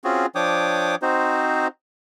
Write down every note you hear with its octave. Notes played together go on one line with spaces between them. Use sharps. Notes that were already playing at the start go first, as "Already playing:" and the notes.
C4 C#4 F4 F#4 G#4
F3 D4 C#5 G5 D6 D#6
C4 D#4 F#4 C5